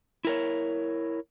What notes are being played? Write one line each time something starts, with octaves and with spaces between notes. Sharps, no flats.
E4 A#4 C#5